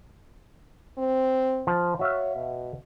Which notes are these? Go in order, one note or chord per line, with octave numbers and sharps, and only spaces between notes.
C4
F3
F#4 C#5 E5 F5
B2